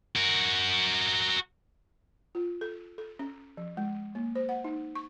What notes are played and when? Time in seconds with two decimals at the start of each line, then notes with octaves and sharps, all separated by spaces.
0.16 F#4 A#4
2.35 F4
2.61 A4
2.98 A4
3.19 C#4
3.57 F3
3.77 G#3
4.15 A#3
4.35 C5
4.49 F#5
4.64 D#4
4.95 C#6